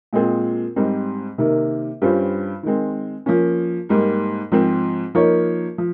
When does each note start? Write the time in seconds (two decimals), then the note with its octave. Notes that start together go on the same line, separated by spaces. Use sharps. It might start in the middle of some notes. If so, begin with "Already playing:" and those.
0.13 A#2 G#3 C4 F4 G#4
0.76 G#2 G3 C4 D#4
1.38 C3 D#3 A#3 D#4
2.02 G2 G3 C#4 F4 C5
2.63 D#3 G#3 C4
3.26 F3 A#3 C#4
3.89 G#2 G3 A#3 D#4
4.52 G#2 F3 C4
5.15 F3 A#3 D#4 A#4 C#5
5.78 F3